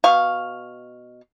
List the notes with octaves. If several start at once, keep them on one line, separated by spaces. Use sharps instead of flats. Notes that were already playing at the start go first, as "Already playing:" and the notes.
B2 F5 C#6